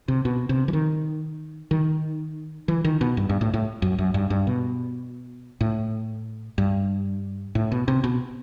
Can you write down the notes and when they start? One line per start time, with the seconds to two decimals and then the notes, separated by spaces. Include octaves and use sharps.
0.08 C3
0.25 B2
0.49 C3
0.68 E3
0.73 D#3
1.71 D#3
2.68 E3
2.84 D#3
3.01 B2
3.17 G2
3.29 G2
3.41 A2
3.54 A2
3.82 F#2
3.99 F#2
4.14 G2
4.30 G2
4.47 B2
5.61 A2
6.58 G2
7.55 A2
7.72 B2
7.88 C3
8.04 B2